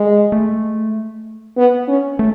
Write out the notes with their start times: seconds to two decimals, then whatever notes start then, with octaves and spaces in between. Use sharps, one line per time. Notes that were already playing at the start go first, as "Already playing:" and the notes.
Already playing: G#3
0.32 A3
1.57 B3
1.88 C#4
2.19 A3